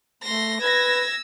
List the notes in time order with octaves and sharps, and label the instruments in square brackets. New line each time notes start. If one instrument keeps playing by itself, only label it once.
[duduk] A3 [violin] C6 A#6
[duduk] B4 [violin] E6 [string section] G#6 A#6